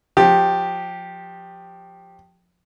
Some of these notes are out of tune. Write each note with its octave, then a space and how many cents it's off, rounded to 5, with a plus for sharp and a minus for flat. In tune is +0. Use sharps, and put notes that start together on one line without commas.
F3 +25 G4 +0